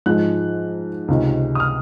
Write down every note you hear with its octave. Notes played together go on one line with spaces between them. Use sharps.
G#2 F3 G#3 F#6
C#2 C3 D#3 G#3
D#6
F6